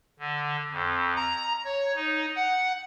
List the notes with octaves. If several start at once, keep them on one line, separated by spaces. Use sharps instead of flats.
D3
F2
A#5
C#5
D#4
F#5